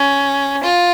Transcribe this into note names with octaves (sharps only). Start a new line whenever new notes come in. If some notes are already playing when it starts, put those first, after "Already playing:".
Already playing: C#4
F4